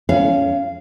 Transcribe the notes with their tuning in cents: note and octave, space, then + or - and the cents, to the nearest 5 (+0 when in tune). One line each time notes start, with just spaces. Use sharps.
C#4 +20 F5 -20